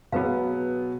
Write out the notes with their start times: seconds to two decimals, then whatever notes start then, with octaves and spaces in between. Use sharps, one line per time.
0.12 B2 F#3 B3 G#4 B4 F5